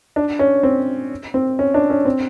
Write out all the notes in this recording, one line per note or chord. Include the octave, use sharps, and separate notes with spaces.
D4
C#4
C4
C4
C#4
D4
C#4
C4